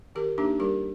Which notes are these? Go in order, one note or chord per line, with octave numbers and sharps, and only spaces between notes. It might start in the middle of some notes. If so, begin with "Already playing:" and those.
D#3 G4 A#4
A#3 D4 D#4 G4
G3 G4 A#4